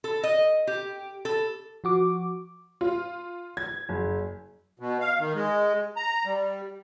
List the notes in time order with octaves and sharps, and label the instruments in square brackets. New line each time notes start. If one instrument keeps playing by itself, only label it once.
[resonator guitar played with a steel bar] A4
D#5
G4
A4
[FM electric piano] F3 F#4 D6
[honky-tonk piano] F4
G#6
F#1
[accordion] B2
F5
D#3
G#3
A#5
G3